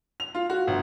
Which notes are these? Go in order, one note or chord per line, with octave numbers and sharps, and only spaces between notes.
F7
F4
F#4
G1